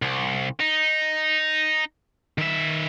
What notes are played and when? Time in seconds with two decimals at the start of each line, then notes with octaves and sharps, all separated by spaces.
0.02 C2
0.60 D#4
2.38 D#3 E5